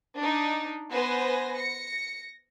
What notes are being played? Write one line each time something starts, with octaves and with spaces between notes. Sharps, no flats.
D4 D#4
B3 B4 C5 G#5 A#6
A#6 C#7